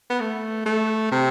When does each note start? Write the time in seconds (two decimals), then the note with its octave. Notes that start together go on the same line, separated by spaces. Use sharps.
0.10 B3
0.20 A3
0.66 A3
1.11 C3